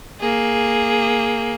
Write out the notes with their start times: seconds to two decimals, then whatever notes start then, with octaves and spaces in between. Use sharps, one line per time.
0.20 A#3 G#4